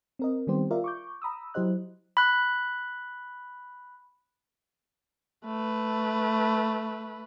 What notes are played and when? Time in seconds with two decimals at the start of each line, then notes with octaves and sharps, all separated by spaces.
0.19 C4 A#4 D#5
0.47 D#3 G3 B3 C4 G4 C5
0.71 F4 A#4 D5 E5 F5
0.84 C#6 D6 G6
1.22 A#5 B5 D#6 E6
1.54 F#3 E4 G4 C5 D#5 F#6
2.17 B5 F#6
5.46 A3 B4